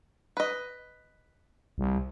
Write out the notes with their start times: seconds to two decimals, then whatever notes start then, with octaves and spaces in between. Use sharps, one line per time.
0.37 B4 D#5
1.78 C2